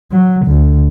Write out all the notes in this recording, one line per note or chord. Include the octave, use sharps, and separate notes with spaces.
F#3
D2